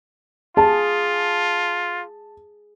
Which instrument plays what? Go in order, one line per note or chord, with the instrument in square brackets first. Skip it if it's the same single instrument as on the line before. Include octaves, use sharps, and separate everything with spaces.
[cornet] F4 [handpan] G#4 [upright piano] A5